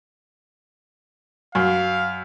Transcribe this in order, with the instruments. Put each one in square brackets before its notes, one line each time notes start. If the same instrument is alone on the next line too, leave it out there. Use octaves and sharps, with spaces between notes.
[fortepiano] F#2 [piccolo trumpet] F5